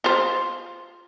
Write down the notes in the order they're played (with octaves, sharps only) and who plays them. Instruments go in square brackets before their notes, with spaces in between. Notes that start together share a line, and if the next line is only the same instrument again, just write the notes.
[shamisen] F4 C5